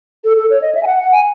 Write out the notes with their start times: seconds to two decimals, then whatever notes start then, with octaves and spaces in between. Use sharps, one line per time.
0.24 A4
0.38 A4
0.50 C#5
0.62 D#5
0.75 E5
0.83 G#5
0.87 F#5
0.99 F#5
1.12 G#5